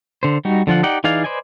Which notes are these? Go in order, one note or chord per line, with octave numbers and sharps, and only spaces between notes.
D3 C5
G3 D#4 F#4
D3 F3 F4 F#5
D#4 G4 D5 F#5 G5
E3 D#4 G#4 D5 F5
B4 C5 D5 D#5 G#5